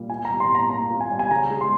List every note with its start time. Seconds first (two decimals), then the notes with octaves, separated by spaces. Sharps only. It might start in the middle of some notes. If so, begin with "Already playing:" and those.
Already playing: A#2 G3 A#3
0.10 F4 G#5
0.25 A#5
0.30 G3
0.40 C6
0.50 A#2
0.55 A#5
0.70 A#3 A#5
0.91 F4
1.01 G#5
1.11 G3
1.19 G#5
1.31 C#3 A#5
1.51 G#3
1.61 C6